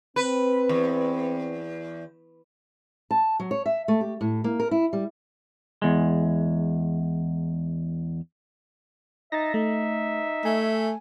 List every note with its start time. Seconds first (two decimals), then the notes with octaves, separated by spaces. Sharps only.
0.16 C4 B4
0.69 E2
3.11 A5
3.40 F#3
3.51 C#5
3.66 E5
3.88 A3
4.01 G4
4.21 A2
4.44 A#3
4.60 A#4
4.71 E4
4.93 G3
5.82 E2 G#3
9.32 D#4 E5 A6 A#6
9.54 A3 D#4
10.45 A3 G#5